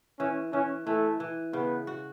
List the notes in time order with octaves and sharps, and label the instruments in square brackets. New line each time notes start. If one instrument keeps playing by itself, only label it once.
[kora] E3 [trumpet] C#4
[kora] E3 [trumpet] C#4
[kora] E3 [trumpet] A3
[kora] E3
[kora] C#3 [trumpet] B3
[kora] F#4